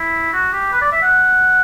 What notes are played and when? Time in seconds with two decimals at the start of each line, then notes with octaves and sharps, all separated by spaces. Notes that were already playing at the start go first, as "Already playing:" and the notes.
Already playing: E4
0.33 F#4
0.53 G4
0.72 B4
0.81 D5
0.92 E5
1.02 F#5